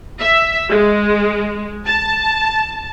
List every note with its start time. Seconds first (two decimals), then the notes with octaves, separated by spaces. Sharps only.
0.19 E5
0.70 G#3
1.85 A5